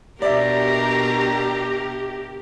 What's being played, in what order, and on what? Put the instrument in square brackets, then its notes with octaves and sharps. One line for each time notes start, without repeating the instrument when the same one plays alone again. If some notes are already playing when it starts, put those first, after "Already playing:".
[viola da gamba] B2 D4 A#4 [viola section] G4 [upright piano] D5 E5 [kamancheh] A#5